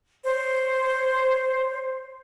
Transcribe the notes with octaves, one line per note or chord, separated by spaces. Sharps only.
C5 C#5